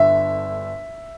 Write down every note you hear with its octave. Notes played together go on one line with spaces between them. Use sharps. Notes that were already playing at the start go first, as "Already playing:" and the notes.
Already playing: G1 D3 E5